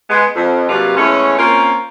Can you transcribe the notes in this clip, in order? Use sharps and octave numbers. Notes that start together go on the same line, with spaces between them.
G#3 B3
F2
C3 F#3 G3 A#3 B3 F4
E2 G#3 A3 C#4
A#3 C4 C#4 F4